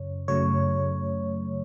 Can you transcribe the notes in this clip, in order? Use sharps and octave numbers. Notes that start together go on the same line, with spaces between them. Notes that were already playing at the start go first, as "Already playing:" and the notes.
Already playing: F#2 C#3 C#5
F#2 C#3 F#3 A3 C#5